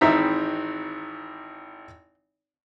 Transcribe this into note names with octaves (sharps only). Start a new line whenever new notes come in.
G#1 E3 C4 D#4 E5 A#5